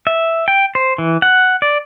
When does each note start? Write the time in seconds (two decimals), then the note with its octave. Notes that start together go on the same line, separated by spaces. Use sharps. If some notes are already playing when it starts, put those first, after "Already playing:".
0.07 E5
0.48 G5
0.75 C5
0.98 E3
1.22 F#5
1.62 D5